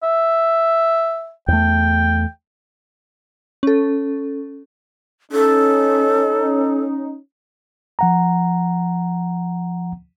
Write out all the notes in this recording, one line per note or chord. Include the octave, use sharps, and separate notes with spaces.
E5
E2 A3 G5
C#4 A4
C#4 D#4 A4
F3 F#5 A#5